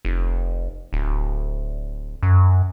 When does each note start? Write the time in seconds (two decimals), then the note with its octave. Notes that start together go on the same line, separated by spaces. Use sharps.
0.05 F1
0.93 D1
2.23 F#2